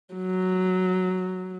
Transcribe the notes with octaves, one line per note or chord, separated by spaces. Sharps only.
F#3